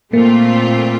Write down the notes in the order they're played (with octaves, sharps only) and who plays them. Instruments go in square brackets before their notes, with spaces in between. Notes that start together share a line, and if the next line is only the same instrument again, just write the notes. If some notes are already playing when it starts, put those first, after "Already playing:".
[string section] A#2 A3 C4 F4 [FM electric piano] A#3